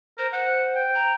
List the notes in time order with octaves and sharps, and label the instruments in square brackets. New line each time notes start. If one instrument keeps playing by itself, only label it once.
[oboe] A#4 [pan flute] C5
[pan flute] C5 [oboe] F#5
[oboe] G5
[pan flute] A#5